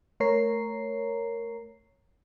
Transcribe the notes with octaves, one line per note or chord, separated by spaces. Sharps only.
A3 A#4 C#5 A#5 C7